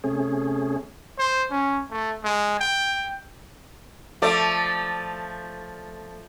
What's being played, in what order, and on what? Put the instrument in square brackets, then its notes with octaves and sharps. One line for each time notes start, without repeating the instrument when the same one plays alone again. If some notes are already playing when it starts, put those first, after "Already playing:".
[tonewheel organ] C3 A3 C#4 G#4
[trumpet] C5
C#4
A3
G#3
G5
[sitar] F3 A3 D5